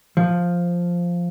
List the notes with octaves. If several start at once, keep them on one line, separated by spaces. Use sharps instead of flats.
F3